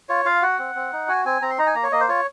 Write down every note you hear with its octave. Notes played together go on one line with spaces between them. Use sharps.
F4 C#5
F4 F5
F#4 F#5
C4
C4
D#4
F#4 G#5
C4 G#5
C4 A#5
C6
D#4 A#5
G#5
A#3 A#5
C#5
A#3 D#5
C5
F4 C#5